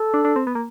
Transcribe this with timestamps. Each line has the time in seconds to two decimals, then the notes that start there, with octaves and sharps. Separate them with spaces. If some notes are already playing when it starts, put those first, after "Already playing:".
Already playing: A4
0.14 D4
0.25 D4
0.36 C4
0.47 B3
0.55 A#3